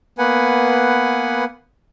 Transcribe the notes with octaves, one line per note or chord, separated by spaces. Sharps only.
A#3 B3 B4 F#5 G#5